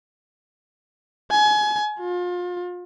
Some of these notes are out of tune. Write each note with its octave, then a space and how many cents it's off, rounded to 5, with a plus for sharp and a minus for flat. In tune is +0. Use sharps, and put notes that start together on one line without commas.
G#5 +30
F4 +30